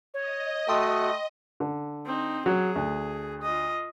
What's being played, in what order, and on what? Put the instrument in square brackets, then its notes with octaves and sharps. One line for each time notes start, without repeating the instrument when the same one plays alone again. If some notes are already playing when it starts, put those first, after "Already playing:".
[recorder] C#5 [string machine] D#5
[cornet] A3 [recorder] F#4 [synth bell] G5 C6 D#6
[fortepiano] D3
[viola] C4 D#4
[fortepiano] F#3 [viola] G#4
[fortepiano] D2
[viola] F4 D#5